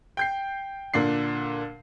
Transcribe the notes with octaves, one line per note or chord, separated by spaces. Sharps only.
G5 G6 C7
A#2 D3 D4 C7